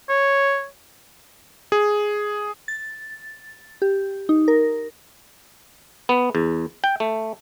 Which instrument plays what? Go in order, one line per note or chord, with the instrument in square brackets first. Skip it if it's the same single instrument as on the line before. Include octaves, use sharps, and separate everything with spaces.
[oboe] C#5
[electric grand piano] G#4
[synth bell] A6
G4
D#4
A#4
[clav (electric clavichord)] B3
E2
G5
A3